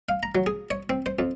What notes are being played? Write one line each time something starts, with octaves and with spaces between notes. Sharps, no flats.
F5
A#5
F#3
G#4
C#5
C4
C5
F2